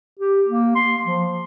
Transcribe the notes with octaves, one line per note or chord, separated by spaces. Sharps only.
G4
A#3
C6
F3